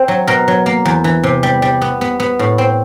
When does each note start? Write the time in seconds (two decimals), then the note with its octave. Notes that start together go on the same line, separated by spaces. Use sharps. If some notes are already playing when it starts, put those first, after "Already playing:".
Already playing: C4
0.08 F#3
0.27 B2 A#4
0.48 F#3
0.66 A#3
0.85 E2
1.04 E3
1.23 C3
1.43 G3
1.62 G3
1.82 B3
2.01 B3
2.20 B3
2.39 A2
2.58 C4